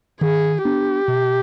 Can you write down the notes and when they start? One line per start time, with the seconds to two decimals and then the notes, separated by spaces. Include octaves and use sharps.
0.21 D#3 G#4
0.64 B3 D4 G4
1.08 B2